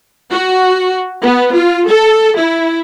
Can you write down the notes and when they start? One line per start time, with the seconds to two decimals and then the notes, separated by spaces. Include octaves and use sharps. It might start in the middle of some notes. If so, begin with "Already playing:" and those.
0.31 F#4
1.23 B3
1.55 F4
1.89 A4
2.37 E4